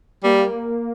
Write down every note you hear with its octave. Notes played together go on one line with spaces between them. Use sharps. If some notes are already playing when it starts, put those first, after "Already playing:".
G3 A#3